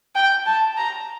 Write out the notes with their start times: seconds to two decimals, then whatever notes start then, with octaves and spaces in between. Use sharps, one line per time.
0.15 G5
0.46 A5
0.78 A#5